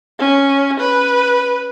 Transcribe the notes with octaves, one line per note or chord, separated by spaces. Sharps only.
C#4
B4